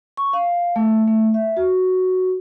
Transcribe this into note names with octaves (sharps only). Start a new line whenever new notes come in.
C#6
F5
A3
A3
E5
F#4